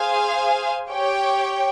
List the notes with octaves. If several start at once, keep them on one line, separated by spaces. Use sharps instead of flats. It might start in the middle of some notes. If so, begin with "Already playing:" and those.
Already playing: G#4 C5 F5 G#5
G4 C#5 G5